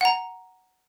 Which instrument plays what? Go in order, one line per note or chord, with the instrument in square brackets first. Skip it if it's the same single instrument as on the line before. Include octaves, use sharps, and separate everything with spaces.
[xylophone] F#5 A#5